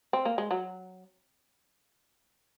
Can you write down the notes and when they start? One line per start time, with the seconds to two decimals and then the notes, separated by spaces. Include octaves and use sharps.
0.13 C4
0.25 A#3
0.38 G#3
0.51 F#3